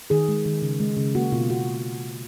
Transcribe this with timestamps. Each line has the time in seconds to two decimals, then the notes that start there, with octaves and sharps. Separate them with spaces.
0.10 D#3 G#4
0.28 G#3
0.46 D#3
0.62 C#3
0.80 G#3
0.97 C#3
1.15 A#3 F#4
1.32 B2 F4
1.50 B2 F#4